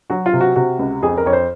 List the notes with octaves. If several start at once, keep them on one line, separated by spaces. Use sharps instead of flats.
F#3 F#4
F4
C3
F#4
C3 F#4
C#2
F2 G#4
A#4
F2 C#5
C5